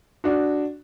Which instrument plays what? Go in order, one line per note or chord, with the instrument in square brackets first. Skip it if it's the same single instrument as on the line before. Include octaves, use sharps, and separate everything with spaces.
[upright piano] D4 F#4